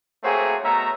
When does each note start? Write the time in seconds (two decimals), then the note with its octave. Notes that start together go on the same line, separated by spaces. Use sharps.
0.23 A3 A#3 C4 F#4 G#4 C#5
0.64 B2 A3 C#4 E5 A#5